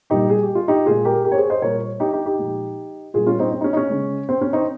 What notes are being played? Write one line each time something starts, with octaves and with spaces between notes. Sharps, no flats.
A#2 G3 D#4 G4
G#4
G4
F4
D#4 G4
A#2 G#3 F4 G#4
G4 A#4
G4 A#4
C#5
G#4 C5
C5 D#5
A#2 G3 A#4 C#5
D#4 G4
D#4 G4
D#4 G4
A#2 F3 G#3
A#2 G3 F4 G#4
C#4 F4
C4 D#4
C4
D#4
C#4
D#4
C#4
C#3 G#3
C4
C#4
C4 D#4